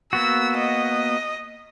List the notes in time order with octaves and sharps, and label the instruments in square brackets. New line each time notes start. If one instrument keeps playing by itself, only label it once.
[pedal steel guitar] A#3 B3 F#4 [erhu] E6
[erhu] D#5